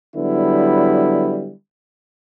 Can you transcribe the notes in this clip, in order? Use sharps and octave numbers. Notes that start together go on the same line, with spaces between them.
D3 F#3 G3 B3 E4